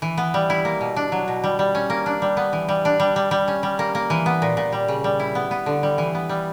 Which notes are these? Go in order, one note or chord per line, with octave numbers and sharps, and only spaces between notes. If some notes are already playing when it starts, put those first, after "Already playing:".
E3
B3
G3
E4
A#3
B2
D4
F#3
B2
G3
G3
C#4
A#3
D4
G3
B3
E3
G3
D4
G3
G3
G3
C#4
G3
A#3
A#3
E3
B3
A#2
A#2
G3
C#3
G3
E4
B3
B3
D3
G3
E3
B3
G3